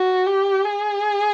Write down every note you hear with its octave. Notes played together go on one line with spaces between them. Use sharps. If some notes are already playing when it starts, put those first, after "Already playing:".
Already playing: F#4
G4
G#4